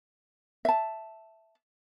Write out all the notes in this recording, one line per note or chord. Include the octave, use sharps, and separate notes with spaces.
E5 A5